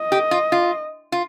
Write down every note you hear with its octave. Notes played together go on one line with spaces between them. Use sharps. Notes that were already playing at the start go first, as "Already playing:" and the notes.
Already playing: D#5
G4
F4
F4
F4